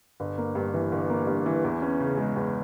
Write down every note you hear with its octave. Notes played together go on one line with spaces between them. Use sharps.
G1
A#3
G2
E3
G1
A#3
G2
E3
E2
C#4
C#3
G#3
E2